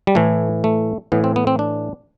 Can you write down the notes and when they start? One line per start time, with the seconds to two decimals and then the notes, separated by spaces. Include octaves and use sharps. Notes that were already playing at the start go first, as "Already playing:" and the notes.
0.07 G3
0.15 A2 E3 A3
0.64 A3
1.12 A2 E3 B3
1.24 C4
1.36 B3
1.47 C4
1.59 D4